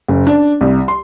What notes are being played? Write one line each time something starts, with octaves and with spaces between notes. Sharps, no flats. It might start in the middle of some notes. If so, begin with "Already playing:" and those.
F#1
D4
C2
C6